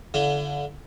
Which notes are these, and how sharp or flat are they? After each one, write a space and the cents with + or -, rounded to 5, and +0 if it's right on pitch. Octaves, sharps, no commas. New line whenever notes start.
D3 -25 E4 +35